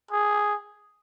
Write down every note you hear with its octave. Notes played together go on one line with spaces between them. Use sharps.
G#4